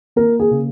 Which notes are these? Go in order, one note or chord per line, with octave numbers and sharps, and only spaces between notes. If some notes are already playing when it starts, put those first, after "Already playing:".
A#3 A#4
G#4
C#3